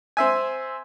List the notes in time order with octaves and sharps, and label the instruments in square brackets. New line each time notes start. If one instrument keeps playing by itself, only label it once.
[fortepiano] C4 E5 G#5